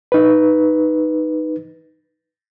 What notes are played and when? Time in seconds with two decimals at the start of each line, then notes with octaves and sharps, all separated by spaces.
0.12 D#4 B4